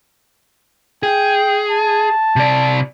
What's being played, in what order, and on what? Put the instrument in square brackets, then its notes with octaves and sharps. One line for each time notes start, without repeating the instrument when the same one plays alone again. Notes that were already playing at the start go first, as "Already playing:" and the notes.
[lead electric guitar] G#4 [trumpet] G5
[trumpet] A5
[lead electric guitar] C3 D5